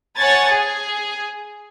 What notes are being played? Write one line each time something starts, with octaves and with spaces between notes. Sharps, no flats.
C#5 F#5 G#5 A5 G#6 A6
G#4